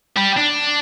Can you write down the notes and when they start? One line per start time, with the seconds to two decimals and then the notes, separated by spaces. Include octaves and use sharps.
0.17 G3
0.38 D4